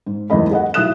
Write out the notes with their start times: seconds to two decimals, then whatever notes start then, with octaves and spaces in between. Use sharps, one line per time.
0.06 G#2
0.30 F#1 E2 G#2 G#3 D#5 B5
0.51 G#4 D#5 F#5
0.74 B1 E4 D#6 F#6 E7